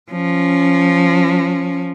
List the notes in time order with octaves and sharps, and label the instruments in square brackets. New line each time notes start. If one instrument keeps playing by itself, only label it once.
[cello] F3 C#4